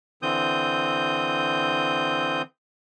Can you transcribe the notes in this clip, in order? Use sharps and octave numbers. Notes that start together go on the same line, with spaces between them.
D3 E3 C4 D#6 G6